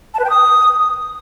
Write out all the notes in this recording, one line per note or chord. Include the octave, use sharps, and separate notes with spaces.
A5
B4
G5
D#6